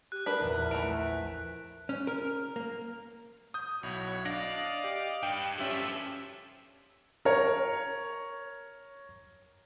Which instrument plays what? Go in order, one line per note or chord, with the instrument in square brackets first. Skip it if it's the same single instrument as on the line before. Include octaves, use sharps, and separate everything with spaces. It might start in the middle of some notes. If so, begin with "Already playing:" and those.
[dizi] G4 [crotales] F#6
[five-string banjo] D4 B4 [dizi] A#4 [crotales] B6
[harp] A#1 E2
[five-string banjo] E3 A3 [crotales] D7
[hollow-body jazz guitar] C#4
A#4
A#3
[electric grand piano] D#6 G6
[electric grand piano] B1 [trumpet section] E4 F#4 C#5
[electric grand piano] D4 A#6 [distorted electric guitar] D5 [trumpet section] D#5 F5
[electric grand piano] G4
[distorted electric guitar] G2 [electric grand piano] G5
[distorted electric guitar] G2 F3 [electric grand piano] C#4 G4 [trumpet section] A4 E5
[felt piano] A#4 C#5